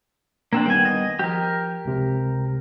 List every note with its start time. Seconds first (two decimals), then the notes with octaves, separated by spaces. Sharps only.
0.53 A#3 C4 D4
0.66 D#3 G3 B3 G5 G#5
0.85 D#5
1.19 F3 G4 A#4
1.85 C#2 C3